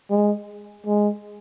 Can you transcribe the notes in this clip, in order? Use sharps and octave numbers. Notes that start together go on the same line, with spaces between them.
G#3
G#3